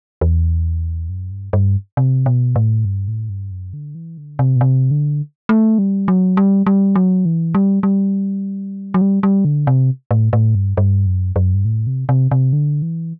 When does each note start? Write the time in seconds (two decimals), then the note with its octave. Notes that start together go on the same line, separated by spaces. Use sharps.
0.21 E2
1.09 F#2
1.31 G2
1.53 G2
1.97 C3
2.26 B2
2.56 A2
2.85 G2
3.08 A2
3.29 G2
3.51 F#2
3.73 D3
3.95 E3
4.18 D3
4.39 C3
4.56 B2
4.61 C3
4.91 D3
5.49 A3
5.78 G3
6.08 F#3
6.37 G3
6.66 G3
6.95 F#3
7.25 E3
7.55 G3
7.83 G3
8.94 F#3
9.01 G3
9.23 G3
9.45 D3
9.67 C3
10.11 A2
10.33 A2
10.55 G2
10.77 G2
11.06 F#2
11.36 F#2
11.54 G2
11.65 A2
11.87 C3
12.09 C3
12.31 C3
12.53 D3
12.82 E3